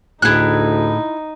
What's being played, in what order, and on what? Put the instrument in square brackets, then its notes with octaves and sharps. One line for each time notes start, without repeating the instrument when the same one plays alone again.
[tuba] D2 [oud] A2 G#4 [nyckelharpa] D#4 [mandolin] E4 F#6